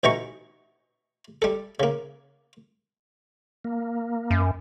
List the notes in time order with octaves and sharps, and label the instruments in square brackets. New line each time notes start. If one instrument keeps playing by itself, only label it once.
[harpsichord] A1 B2 E3 D#4 A#5 C#6
G3 A4
C#3 A#3
[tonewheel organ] A#3
[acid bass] F#2